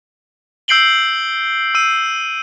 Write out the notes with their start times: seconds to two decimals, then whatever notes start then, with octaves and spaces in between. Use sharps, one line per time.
0.68 E6 G6 C7 D7 F#7 G7
1.75 E6 D#7